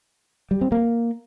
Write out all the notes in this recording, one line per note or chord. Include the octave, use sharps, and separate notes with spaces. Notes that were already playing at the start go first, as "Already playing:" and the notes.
G3
C4
A#3